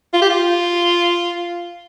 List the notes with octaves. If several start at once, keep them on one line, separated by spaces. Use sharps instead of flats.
F4
G4
F4